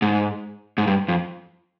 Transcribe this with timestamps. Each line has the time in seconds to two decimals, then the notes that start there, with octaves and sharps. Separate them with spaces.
0.02 G#2
0.78 G#2
0.87 G2
1.08 F2